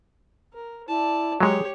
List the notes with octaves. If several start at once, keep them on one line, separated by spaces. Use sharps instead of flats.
A#4
E4 D5 A5
F#3 G#3 G4 G#4 C#5